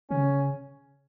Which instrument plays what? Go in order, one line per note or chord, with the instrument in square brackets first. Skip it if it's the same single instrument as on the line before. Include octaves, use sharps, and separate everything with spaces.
[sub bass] C#3 [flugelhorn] C#4